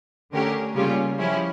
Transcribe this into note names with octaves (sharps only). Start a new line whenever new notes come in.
D3 A3 C#4 G4 A#4
C#3 G3 A#3 C#4 F4
F3 C#4 E4 G4